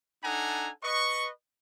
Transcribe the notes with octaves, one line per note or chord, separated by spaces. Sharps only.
D4 D#4 A4 F#5 G#5 A#5
B4 D#5 C#6